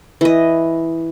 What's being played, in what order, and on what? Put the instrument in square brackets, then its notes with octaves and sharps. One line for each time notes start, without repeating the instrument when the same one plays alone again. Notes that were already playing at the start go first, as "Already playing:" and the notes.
[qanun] E3 D#5